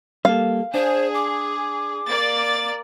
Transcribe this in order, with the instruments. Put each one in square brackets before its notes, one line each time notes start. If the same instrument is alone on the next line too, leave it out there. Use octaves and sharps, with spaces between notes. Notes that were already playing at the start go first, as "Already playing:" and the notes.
[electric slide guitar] G3 A#3 A4 [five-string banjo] F5
[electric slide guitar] D4 [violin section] G#4 [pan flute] C5
[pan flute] D6
[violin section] A#3 D5 A6